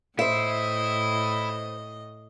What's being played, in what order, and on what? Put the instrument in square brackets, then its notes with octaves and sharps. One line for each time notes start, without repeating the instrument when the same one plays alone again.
[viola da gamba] A2 D#5 [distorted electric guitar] E4 [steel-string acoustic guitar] C5 E5